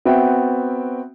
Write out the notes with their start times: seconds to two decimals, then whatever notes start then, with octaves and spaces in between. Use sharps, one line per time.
0.05 B3 C4 F#4 E5 G5